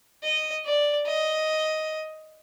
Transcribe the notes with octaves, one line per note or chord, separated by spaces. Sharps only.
D#5
D5
D#5